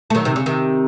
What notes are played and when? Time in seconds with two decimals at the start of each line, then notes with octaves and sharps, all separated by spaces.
0.10 A3
0.15 D#3 F#3
0.25 C3 D#3
0.36 C#3
0.46 C3 D#3